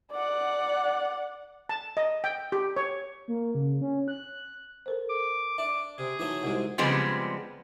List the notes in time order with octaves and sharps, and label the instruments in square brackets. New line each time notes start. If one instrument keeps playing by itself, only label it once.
[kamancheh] D5 F#5
[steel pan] A5
D#5
G5
G4
C#5
[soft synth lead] A#3
C#3
C#4
F#6
[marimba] A4 A#4 C5
[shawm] D6
[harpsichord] D4 [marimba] E5 [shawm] D6
[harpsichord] C3 [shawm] G#4
[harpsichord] E3 F#3 A3 [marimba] D#4
[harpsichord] C2 G#2 C3 [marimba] G3 F#4
[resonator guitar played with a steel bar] C#3 F3 G3 G#3 B3 C4